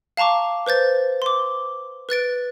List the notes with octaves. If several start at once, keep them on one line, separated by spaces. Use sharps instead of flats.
F5 A5 A#5 C#6 D6
B4 C5 G6 A6
C6 D6
B4 F#6 A6 D7